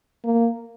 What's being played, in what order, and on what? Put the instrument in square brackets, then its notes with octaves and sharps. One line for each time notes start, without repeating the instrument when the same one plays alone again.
[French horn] A#3